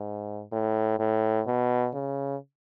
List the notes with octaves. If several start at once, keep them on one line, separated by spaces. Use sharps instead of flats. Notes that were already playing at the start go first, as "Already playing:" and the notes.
Already playing: G#2
A2
A2
B2
C#3